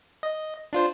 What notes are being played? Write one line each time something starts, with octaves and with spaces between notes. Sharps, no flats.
D#5
D4 F4 C5